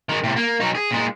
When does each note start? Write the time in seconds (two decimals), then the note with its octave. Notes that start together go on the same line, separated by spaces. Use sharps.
0.09 D#3 G#3
0.24 A2 C3
0.36 A#3
0.60 F#3 D#4
0.75 G#4
0.91 A#2 G#3